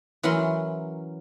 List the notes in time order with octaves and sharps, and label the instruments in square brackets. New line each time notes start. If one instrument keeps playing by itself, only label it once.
[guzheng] E3 F#3 C#4 A#4 B5 C6